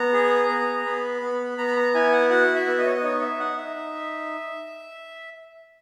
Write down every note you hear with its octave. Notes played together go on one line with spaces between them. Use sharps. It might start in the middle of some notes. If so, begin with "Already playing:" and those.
Already playing: B3 A#5
G#4
B3
B3 B5
B3
B3 A#5
B5
A#5
E4 G#5
F#5
F#4 F#5
E5
B3
D#5
C#5
D#5
D#4 C#5
E5
D#4 F#5
E5
D#4